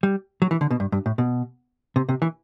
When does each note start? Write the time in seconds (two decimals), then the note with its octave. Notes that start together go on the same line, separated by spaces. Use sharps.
0.03 G3
0.42 F#3
0.51 E3
0.61 D3
0.71 B2
0.80 G2
0.92 G2
1.06 A2
1.18 B2
1.96 C3
2.09 C3
2.22 E3